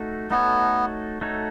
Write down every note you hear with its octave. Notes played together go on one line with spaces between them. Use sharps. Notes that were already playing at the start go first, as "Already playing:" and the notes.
Already playing: A3 D#4 F#4 A4
A3 B3 D#4 F#4 A4 C#5
A3 D#4 F#4 A4 C#5